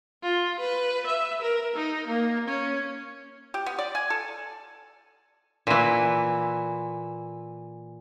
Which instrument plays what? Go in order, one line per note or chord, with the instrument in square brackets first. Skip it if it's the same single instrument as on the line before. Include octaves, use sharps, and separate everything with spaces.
[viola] F4
B4
E5
A#4
D#4
A#3
C#4
[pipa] G4
B3
D5
G#5
A4
[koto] A#2 E3